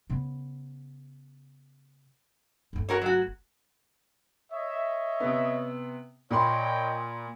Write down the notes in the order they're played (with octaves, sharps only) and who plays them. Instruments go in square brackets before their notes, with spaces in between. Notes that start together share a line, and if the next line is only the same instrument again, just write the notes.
[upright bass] C#3 B3
G1 A3
[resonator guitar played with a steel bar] F#4 A#4 C#5
F#3 F#4
[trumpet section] C#5 D#5 E5
[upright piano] C3 B3
[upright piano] A#2 B5 C6 [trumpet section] C#5 D#5 G5